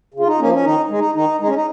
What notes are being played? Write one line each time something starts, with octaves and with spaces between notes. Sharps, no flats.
C#3
F4
D#4
F3 A#3 C#4
C#4
D#3 D#4
G#3
D#4
D#3 D#4
G#3 D#4
C#4
D#4